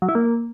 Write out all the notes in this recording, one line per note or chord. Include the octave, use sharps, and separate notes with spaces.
F#3
E4
A#3